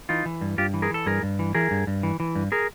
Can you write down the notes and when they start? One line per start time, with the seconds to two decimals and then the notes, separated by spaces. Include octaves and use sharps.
0.09 E3 D#4 F4
0.26 E3
0.41 G2
0.58 G2 F4 G4
0.74 E3
0.82 G#4 A#4
0.91 E3 A4
1.06 G2 G#4 A#4
1.23 G2
1.39 E3
1.55 E3 G#4 A#4
1.71 G2
1.87 G2
2.03 E3
2.20 E3
2.36 G2
2.52 G#4 A#4